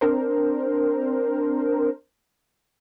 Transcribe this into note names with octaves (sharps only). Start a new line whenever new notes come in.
C4 D4 A#4 C5